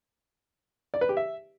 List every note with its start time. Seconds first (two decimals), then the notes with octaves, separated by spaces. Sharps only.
0.94 D5
1.01 B4
1.09 G4
1.17 E5